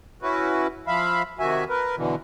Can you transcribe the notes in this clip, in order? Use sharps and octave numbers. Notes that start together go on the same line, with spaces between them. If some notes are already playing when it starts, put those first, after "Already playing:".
C#4 E4 F#4 B4
F3 E5 F5 B5
C3 D#3 F#4 E5 G#5
A#4 B4
B2 D3 E3